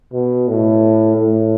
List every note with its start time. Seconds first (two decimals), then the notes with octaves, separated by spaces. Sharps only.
0.13 B2
0.48 A2
1.16 A2